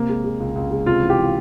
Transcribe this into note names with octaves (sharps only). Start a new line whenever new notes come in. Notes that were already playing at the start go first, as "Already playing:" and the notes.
Already playing: C3 A#3
G#3
G#3
C#2
C#2
G#3
C3 F4
E3
G4
E3